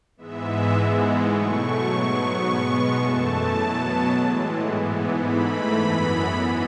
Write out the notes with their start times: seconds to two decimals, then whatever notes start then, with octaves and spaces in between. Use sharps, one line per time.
0.17 G#2 E3 G#3 B3 E5
0.73 G#2 E3 G#3 B3
1.28 B2 F#3 A3 C#6
1.83 G#2 F#3 B3 C#6
2.40 B2 G#3 B3
2.95 F#2 E3 A3 A5
3.51 B2 F#3 B3
4.07 A2 E3 G#3
4.62 G#2 E3 B3
5.18 G#2 E3 A3 B5
5.74 F#2 E3 B3
6.29 G#2 E3 B3